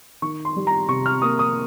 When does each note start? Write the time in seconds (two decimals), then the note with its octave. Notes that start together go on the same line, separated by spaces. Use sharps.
0.22 D#3 C#6
0.45 C6
0.56 G3
0.67 A#5
0.88 C3 C#6
1.06 F6
1.22 A#3 D#6
1.39 D#6